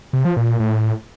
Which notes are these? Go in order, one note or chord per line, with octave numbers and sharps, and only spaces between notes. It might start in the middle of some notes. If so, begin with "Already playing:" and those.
C3
F3
A#2
A#2
A2